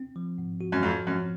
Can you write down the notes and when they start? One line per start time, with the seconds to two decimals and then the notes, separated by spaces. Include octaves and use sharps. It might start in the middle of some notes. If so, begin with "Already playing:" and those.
Already playing: C4
0.16 F3
0.38 G#2
0.61 F#4
0.72 F#2
0.83 F2 C4
1.06 F#2 F3